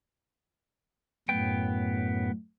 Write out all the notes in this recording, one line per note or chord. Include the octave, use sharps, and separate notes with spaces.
F#2 A2 B3 G5